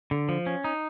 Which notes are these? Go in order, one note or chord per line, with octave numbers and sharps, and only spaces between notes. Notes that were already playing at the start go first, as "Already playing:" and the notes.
D3
F3
C#4
D#4